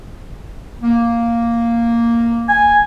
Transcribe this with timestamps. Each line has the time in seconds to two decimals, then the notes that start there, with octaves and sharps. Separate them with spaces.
0.82 A#3
2.49 G#5